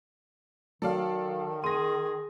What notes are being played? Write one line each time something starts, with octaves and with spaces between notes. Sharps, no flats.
D#3 F#3 A4 D5 F5
G#4 C6 A#6 D#7